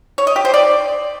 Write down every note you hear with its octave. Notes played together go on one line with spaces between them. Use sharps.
C#5
D#5
G4
C5
D5